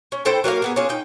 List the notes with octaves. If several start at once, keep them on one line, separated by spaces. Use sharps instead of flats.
C#4
E4 A4 C5 G5
F#3 A#3 A#4 F5
A#3 B3 G#4
C#4 D4 F4 G#4
D#4 G5